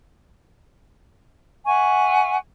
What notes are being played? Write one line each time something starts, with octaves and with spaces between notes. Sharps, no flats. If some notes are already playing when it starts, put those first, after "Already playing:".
E5 F#5 G#5 C#6